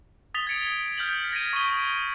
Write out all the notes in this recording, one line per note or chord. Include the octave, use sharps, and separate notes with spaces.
D#6 A6 B6 F7 G7
G#6 A6 C#7 D7
F6 G6 B6 F#7
G#6 A#6 B6 D7 D#7
C#6 D#6 D7 D#7 G7